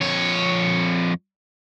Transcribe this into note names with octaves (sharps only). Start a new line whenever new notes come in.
F2 C#5